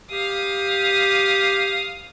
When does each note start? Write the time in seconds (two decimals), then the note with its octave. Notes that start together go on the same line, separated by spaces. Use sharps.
0.11 G4 F5 D#6